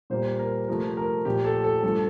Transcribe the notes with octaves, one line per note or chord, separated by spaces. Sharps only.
A#2 G3 A#3 C5
A#4
C3 F3 A3 A#4
A#4
A#2 F3 A3 G4
A4
A4
G2 F3 A3 A4